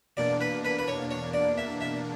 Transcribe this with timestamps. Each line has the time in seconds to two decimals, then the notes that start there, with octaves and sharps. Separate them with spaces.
0.17 E2 B2 A#3 D4 D5
0.40 B4
0.65 B4
0.79 B4
0.88 C#5
1.11 C#5
1.33 D5
1.58 E5
1.81 E5